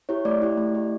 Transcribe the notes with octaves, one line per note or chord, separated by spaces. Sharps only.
E4 G4 C#5
A3 D5
E4 G4
A3
E4 G4